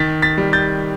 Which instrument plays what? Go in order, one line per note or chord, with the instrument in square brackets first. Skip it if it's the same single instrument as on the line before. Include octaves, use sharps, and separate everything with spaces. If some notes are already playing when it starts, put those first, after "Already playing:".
Already playing: [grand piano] D#3 A6 B6
A6 B6
G3
G6 A6